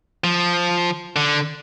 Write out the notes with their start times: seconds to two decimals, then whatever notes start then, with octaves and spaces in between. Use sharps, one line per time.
0.24 F3
1.16 D3